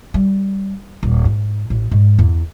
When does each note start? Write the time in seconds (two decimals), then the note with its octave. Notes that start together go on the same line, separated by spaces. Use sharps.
0.14 G3
1.03 D#1
1.25 G#2
1.70 A1
1.91 G#2
2.19 E2